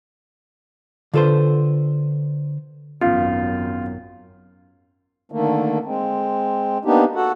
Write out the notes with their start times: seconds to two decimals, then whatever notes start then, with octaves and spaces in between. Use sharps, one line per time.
1.14 D3 F4 A4 B4 C5
3.01 G#1 F#2 B3 C#4 F4
5.32 D3 D#3 A3 A#3
5.85 G#3 C4
6.85 A#3 B3 D4 D#4 G4
7.15 F#4 A4 F#5